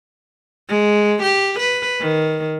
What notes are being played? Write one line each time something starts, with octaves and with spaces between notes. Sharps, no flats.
G#3
G4
B4
D#3